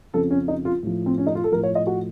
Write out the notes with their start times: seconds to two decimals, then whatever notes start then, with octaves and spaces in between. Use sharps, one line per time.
0.13 F2 C#3 F3 A4
0.31 C#4
0.48 D#4
0.65 F4
0.83 A2 F3
1.06 C4
1.18 C#4
1.27 D#4
1.35 F4
1.44 A4
1.52 A2 F3 A#4
1.63 C#5
1.75 D#5
1.87 F#4